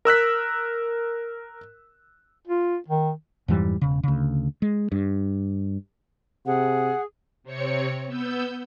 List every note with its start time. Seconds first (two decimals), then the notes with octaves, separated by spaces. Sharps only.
0.05 A#4 E6 F#6 B6
2.47 F4
2.88 D#3
3.48 F2 G#2 E3 G3
3.81 E1 C#3
4.03 D2 C#3
4.62 G#3
4.92 G2
6.46 C3 G#4 F#5
7.43 C3 C4 C#5 C#7
8.07 B3 E6 G6